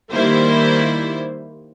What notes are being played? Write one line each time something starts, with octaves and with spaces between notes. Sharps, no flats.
D#3 G3 A#3 E4 C5